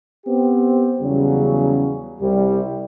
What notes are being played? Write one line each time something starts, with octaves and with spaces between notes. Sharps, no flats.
B3 C4 G4
E2 C#3 F#3 G3 C#4
C2 G3